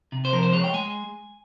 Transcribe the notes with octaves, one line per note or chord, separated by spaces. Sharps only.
C3
C5
F3 A#4
C5
G#3 C#5
G5
G#3 G#5